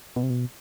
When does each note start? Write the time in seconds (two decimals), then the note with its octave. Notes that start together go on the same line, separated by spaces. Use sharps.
0.16 B2
0.23 C3
0.30 B2